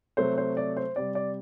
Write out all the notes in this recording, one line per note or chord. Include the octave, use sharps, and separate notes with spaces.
C3 F#3 A3 C5
C5
D5
C5
C3 G3 D5
D5